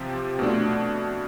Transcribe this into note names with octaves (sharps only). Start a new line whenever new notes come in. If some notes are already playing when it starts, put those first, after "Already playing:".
Already playing: C3 F3 C4 G4
B2 A3 D4